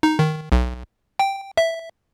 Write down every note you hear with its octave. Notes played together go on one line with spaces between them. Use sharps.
D#4
D#3
B1
G5
E5